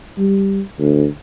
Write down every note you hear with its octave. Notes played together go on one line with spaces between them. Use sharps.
G3
D2